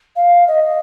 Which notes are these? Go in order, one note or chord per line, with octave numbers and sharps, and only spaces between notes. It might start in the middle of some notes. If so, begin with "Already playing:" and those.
F5
D#5